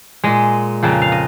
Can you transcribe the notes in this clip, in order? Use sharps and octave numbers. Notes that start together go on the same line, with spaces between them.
A#2 G#3 D#5
F2 C#3 F3 A#3
F5
D#5